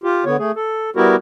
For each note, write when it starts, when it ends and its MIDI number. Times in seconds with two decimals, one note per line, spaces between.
0.04 0.24 65
0.04 0.24 67
0.25 0.37 50
0.25 0.37 59
0.25 0.37 73
0.38 0.51 57
0.38 0.51 68
0.56 0.90 69
0.96 1.16 55
0.96 1.16 59
0.96 1.16 64
0.96 1.16 66
0.96 1.16 67
0.96 1.16 70